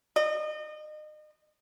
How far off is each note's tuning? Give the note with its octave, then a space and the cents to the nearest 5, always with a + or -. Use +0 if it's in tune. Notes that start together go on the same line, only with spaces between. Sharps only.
D#5 -35